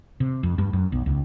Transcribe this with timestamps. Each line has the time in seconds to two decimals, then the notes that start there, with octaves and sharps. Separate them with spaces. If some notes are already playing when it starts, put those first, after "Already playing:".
0.20 C3
0.43 F2
0.58 G2
0.73 F#2
0.92 B1
1.06 C#2